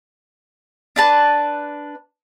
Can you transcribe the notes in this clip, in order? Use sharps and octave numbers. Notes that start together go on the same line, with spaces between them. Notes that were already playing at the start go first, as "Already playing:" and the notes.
D4 B4 A5